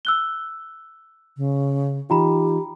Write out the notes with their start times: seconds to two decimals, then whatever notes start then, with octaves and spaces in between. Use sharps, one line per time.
0.05 E6 F#6 G7
1.37 C#3
2.10 E3 D#4 F4 G4 G5 A#5 B5